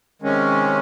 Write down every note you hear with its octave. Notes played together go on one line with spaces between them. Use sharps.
C3 D#3 G#3 C#4